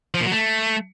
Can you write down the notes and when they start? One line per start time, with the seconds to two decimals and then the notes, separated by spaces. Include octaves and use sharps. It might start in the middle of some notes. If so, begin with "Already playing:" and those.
0.14 F3
0.20 A#2
0.26 F#3
0.31 A3